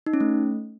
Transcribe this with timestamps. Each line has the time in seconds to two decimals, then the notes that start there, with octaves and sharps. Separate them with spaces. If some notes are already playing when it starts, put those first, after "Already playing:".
0.06 D#4
0.13 C#4
0.20 A3